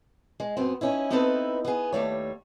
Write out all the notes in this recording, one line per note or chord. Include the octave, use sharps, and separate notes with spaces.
G#3
F#2 B3 C4
C#4 D#4 E4
B3 C4 D#4 E4 A4 B4
B3 G#4
D#2 G3 A3 C#5